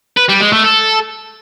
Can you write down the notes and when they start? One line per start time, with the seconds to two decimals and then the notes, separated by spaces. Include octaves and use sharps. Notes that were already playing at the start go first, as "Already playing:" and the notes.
0.17 B4
0.29 G3
0.40 G#3
0.52 A3
0.64 A4